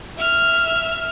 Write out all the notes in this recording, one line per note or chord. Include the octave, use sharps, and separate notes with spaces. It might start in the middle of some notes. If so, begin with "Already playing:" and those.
E5 F6